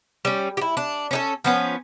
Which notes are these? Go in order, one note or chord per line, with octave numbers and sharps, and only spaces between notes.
G3 C#4
E4 G4
D4
C#4 D#4 A4
F3 B3 C#4